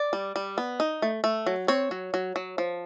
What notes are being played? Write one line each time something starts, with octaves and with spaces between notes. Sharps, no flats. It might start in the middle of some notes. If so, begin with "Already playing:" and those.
Already playing: D5
G3
G3
B3
D#4
A3
A3
F#3
C4 C#5
F#3
F#3
F#3
F3